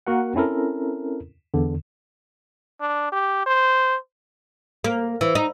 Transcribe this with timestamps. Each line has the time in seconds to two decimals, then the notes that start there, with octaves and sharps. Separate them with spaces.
0.07 A#3 F#4 A#4 F#5
0.35 C4 C#4 E4 A4 A#4
1.54 E2 D3
2.81 D4
3.12 G4
3.46 C5
4.84 A#3
5.21 E3
5.35 D#4